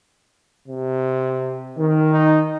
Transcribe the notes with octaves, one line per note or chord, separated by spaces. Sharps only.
C3
D#3
D#4